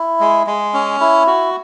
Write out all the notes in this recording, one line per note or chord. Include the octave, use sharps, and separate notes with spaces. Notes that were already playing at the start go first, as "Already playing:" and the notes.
Already playing: E4
G#3
G#3
C#4
E4
F#4